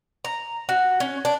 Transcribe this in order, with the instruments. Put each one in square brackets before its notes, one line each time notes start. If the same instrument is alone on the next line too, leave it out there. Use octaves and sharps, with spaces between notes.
[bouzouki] A#5
F#4
C#4
D4